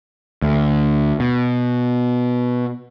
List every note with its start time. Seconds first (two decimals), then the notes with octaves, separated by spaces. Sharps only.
0.42 D2
1.20 B2